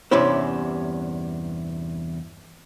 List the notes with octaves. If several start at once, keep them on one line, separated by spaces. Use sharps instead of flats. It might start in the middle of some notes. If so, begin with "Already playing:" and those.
E2 G2 C3 C#4 E4 C5